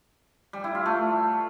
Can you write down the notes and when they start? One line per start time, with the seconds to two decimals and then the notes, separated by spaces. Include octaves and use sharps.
0.53 G3
0.64 E4
0.75 F4
0.86 A3